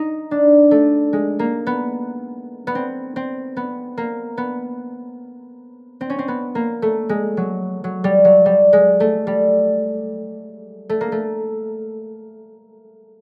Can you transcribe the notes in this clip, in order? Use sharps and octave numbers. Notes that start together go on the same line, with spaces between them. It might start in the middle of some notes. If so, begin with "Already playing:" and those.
Already playing: D#4
D4
A3
G#3
A#3
B3
B3
C4
C4
B3
A#3
B3
C4
C#4
C4
B3
A#3
A3
G#3
F#3
F#3
G3
F#3
G3
G#3
A3
G3
A3
A#3
A3